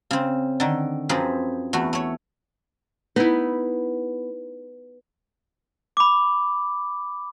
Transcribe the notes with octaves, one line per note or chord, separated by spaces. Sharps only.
C#3 C4
D3 D#3
F#2 F3 C4 G#4 B4 A#5
E2 A3 F#4
A3 C#5
B3 D#4 E4
B5 D6